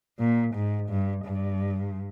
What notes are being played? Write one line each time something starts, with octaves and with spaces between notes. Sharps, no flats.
A#2
G#2
G2
G2